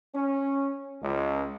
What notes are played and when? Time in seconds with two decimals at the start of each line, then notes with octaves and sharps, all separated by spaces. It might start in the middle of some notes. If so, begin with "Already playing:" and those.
0.14 C#4
1.01 C#2